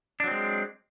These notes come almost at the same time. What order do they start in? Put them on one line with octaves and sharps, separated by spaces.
D4 F#3 C4 G#3